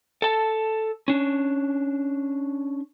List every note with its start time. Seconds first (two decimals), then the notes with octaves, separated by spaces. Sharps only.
0.22 A4 A5
1.08 C#4 D4